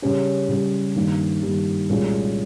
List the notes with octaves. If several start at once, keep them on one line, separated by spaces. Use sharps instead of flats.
C#3 G3 C#4 G4
C#3 G3 C#4 G4
G2 D#3 A#3 D#4 G4
G2 D#3 A#3 D#4 G4
C2 A#2 G#3 C#4 F4